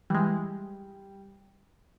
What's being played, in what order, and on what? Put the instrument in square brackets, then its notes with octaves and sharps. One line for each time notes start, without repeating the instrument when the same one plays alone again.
[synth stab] E3 G#3 [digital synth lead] G3